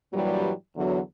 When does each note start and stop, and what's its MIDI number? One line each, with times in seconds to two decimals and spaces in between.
0.13 0.52 43
0.13 0.52 46
0.13 0.52 52
0.13 0.52 54
0.13 0.52 55
0.76 1.00 40
0.76 1.00 50
0.76 1.00 54